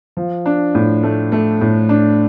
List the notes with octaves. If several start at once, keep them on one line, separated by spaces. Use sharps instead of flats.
F3
D4
A2
A3
A3
A2
D4